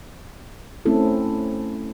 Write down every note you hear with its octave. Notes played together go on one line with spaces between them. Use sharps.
A3 C4 C#4 E4 A4